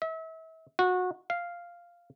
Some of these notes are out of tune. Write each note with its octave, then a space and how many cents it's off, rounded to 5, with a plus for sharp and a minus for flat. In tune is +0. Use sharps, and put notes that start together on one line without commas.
E5 -35
F#4 -25
F5 -5